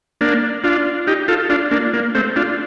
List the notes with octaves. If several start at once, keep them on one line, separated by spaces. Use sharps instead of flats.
A#3 D4
D4 F4
D#4 G4
F4 A4
D4 F4
A#3 D4
A#3
A3 C4
D4 F4